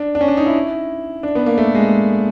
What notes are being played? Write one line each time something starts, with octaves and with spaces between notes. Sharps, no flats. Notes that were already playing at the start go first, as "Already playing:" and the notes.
Already playing: D4
D4
C#4
D4
D#4
E4
D4
B3
A#3
A3
G#3